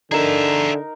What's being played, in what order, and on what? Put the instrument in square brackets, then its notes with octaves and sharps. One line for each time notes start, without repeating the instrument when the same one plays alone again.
[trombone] D3 [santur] D#4 A#4 [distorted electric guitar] G#4 E5